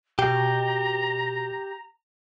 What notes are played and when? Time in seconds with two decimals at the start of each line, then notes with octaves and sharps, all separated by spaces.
0.19 B2 G4 A#5